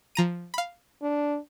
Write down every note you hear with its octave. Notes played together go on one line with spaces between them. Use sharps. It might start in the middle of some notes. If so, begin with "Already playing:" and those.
F3 A#5 D#7
F5 B5
D4